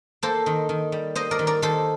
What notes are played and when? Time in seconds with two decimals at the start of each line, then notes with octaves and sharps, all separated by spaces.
0.23 A#3 A4 C5
0.46 D#3
0.69 D#3
0.92 G3
1.15 A#3 C5 D#5
1.31 A#4 D5
1.39 D#3
1.47 A#4 D5
1.62 D#3 A4 C5